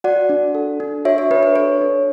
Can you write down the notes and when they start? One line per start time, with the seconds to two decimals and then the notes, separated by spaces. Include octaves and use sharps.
0.04 F#4 D5 F#5
0.29 D4
0.55 A4
0.80 D4
1.05 F#4 C#5 E5
1.18 C#5
1.31 D4 B4
1.43 B4
1.56 A4 C#5
1.81 D4